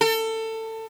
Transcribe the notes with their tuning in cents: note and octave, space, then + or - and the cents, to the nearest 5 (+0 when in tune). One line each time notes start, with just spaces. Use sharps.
A4 +25